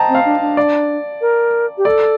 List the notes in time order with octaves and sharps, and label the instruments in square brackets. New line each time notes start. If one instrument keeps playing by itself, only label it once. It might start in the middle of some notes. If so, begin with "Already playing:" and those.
Already playing: [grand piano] C5 D#5 G5 A5 A#5
[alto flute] C4
[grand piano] F5
[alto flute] D4
D4
[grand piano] D5
[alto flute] A#4
G4
[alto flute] A4 [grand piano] D5